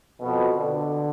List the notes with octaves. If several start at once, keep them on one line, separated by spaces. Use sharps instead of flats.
F2 B2
D3